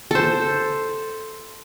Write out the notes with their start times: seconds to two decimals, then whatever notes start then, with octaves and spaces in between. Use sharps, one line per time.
0.11 A4 C5